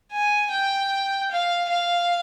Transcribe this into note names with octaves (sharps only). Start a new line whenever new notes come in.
G#5
G5
F5
F5